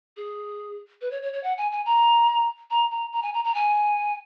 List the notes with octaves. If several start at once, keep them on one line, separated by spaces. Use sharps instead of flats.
G#4
B4
C#5
C#5
C#5
F#5
G#5
G#5
A#5
A#5
A#5
A#5
G#5
A#5
A#5
G#5